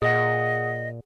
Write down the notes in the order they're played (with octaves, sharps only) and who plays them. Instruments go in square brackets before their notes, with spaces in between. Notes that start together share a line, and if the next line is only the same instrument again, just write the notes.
[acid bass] A#2 [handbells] G#4 F#5 [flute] D#5